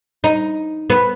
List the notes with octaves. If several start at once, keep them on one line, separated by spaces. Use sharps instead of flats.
D#4
B3